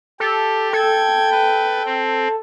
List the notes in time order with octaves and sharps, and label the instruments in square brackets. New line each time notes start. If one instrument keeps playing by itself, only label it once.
[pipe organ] G4 [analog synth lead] A4
[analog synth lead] A4 [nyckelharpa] G5 [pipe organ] G#6
[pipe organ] B4
C4